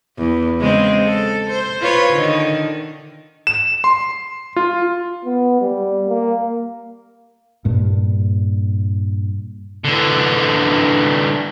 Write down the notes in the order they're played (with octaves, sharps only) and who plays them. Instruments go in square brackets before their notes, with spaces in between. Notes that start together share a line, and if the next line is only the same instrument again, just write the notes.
[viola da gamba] E2
C#3 G#3 C4
A4
C5
F4 B4 C#5
D3 D#3
[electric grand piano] E7
C6
F4
[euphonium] B3
G3
A#3
[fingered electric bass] G2 A#2
[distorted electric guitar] D3 E3